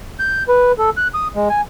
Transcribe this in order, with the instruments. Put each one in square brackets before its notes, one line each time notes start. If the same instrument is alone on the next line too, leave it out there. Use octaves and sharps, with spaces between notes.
[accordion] G6
B4
A4
F#6
D#6
G#3
G#5